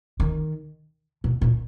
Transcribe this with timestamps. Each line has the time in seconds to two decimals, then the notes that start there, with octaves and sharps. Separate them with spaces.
0.20 D#3
1.24 B2
1.41 A#2